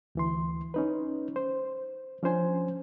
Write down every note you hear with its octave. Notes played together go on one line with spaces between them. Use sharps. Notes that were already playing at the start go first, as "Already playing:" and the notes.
D2 E3 C6
C#4 D#4 B4
C5
F3 C#4 D4 C5 G#5